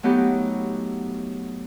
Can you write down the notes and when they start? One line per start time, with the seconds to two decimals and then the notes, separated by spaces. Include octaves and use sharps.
0.03 F#3 A3 B3 D#4 G4